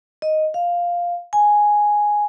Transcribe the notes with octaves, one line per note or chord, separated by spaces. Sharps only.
D#5
F5
G#5